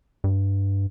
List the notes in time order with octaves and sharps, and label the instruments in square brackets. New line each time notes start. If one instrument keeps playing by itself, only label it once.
[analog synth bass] G2